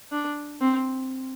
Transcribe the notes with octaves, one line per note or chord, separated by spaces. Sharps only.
D4
C4